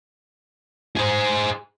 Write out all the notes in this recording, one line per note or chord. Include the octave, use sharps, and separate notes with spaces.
G#4 C5